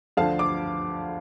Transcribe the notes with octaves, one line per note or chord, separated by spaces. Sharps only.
D2 D3 F3 F5 A5
A5 D6